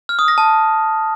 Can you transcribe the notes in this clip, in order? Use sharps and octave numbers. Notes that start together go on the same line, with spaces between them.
F6
D#6
A#6
A5